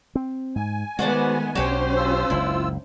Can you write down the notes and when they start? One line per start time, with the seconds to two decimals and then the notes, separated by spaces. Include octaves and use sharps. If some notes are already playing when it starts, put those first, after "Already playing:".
0.15 C4
0.56 G#2 G#5
0.99 D#3 G#3 A3 B3 F#4 C5 D5
1.55 B1 F#3 C#4 D4 F#4 G4 C5 C#5
1.97 F4 E6
2.30 F#1 C#2 F#2 E4